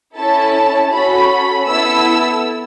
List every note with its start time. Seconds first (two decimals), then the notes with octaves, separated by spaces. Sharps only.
0.15 C#4 E4 A4 A5
0.91 C#4 F#4 A4 B5
1.65 B3 E4 A4 E6